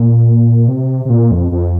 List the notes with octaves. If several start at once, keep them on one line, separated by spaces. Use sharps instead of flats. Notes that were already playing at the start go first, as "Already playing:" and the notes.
Already playing: A#2
C3
C3
A#2
F2
F2